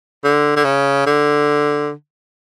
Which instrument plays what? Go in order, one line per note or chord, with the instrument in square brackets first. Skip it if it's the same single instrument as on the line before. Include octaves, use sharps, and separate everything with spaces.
[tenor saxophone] D3
D3
C#3
D3